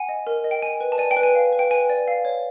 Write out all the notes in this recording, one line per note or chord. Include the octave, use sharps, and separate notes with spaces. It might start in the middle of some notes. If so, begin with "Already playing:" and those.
Already playing: F#5 G#5
D#5
A#4
D#5
G5
G5 G#5
B4
A5
D5 G#5
G5
B4
G#5
F5
B4
G5
B4 G#5
D5
F5
C#5